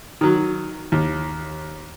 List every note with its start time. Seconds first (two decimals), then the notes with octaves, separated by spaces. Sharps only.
0.21 D#3 F#3
0.92 D#2